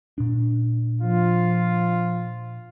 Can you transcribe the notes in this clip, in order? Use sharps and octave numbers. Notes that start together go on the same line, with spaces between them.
A#2 D4
F3 F4